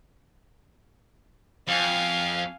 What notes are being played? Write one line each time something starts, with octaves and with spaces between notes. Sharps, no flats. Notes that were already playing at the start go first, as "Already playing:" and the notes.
F2 F5 G#5